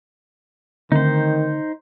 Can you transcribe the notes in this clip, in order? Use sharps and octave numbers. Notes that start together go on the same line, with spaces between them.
D3 D#3 A3 C4 D#4 C5